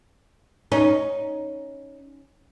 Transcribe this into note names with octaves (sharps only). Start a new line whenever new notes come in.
C#4 D#4